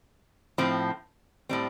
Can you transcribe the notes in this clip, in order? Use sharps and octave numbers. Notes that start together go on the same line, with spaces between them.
A2 F3 C4
A2 G3 C4